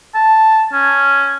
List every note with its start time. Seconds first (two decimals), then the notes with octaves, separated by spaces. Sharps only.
0.15 A5
0.73 C#4